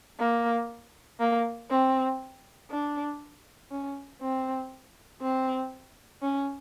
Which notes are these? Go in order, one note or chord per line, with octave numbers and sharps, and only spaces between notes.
A#3
A#3
C4
D4
C#4
C4
C4
C#4